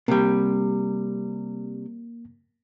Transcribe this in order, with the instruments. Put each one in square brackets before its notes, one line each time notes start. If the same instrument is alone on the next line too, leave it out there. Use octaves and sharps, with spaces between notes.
[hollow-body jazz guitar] C3 G3 [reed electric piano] A#3